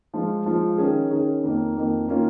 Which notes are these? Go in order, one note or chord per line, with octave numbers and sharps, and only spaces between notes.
F3 G#3 F4
F3 G#3 F4
D#3 C#4 G#4
D#3 C#4 G#4
F2 D#3 A#3
F2 D#3 A#3
D#3 A#3 C#4 F4